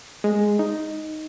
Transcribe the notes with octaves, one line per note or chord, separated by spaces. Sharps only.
G#3
D#4